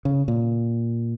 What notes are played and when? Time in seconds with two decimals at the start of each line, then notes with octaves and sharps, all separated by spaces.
0.05 C#3
0.28 A#2